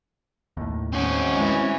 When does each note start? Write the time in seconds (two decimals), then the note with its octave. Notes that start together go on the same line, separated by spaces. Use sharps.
0.57 D#2 A2
0.93 C4 C#4 F#4
1.37 E3 G#3